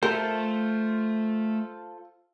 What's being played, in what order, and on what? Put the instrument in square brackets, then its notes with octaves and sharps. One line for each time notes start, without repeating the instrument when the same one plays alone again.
[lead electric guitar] A3 E5 [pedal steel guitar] F4 A4 C5 [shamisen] A#4